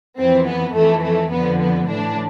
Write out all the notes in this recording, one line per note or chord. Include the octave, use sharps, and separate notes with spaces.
F2 E3 C4
B3
F2 E3 A3
A3
F2 D3 F3 B3
B3
A2 E3 D4